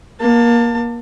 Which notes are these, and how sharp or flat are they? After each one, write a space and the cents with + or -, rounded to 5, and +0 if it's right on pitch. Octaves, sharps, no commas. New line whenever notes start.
A#3 +20 A5 +30